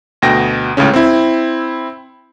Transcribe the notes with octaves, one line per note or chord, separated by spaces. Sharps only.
D2 B2 G5 A#6
C#2 A2 C#3 C#4
C4 E4